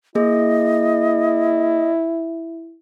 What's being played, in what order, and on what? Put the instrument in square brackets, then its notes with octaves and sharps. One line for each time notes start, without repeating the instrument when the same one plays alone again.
[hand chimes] A#3 G#4 [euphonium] E4 [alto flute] D#5